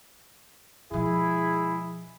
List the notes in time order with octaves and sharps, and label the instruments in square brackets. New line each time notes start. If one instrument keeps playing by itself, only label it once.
[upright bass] B2 F3 [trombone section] G#3 E4 G#4